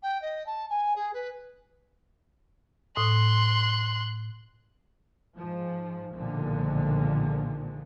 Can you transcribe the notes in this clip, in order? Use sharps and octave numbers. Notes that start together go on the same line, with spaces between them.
G5
D#5
A5
G#5
G#4
B4
A2 C6 D#6 F#6
G#2 F3
B1 A#2 D3 D#3 F3 G#3